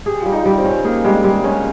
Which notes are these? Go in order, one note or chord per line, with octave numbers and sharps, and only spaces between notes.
G4 G#4
G3 F4
D#4
G3
C4
C#4
A#3 G#4
G3 G#3
G3 G#3
G#3 C#4